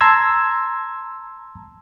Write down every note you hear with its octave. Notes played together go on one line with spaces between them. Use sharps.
A5 A#5 C6 E6 G#6